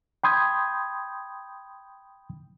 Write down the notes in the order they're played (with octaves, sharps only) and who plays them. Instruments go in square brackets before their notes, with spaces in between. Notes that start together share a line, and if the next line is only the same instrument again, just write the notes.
[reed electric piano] G5 B5 C6 D#6 G6 G#6